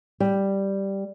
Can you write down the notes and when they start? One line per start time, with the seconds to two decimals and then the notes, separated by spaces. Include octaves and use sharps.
0.20 G3